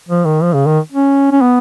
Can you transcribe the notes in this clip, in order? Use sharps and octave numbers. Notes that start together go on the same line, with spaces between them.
F3
D#3
F3
C#3
D#3
C#4
C#4
B3